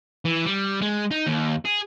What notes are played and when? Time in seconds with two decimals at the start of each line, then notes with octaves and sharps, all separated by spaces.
0.25 E3
0.45 G3
0.81 G#3
1.11 D#4
1.27 D#2
1.65 G#4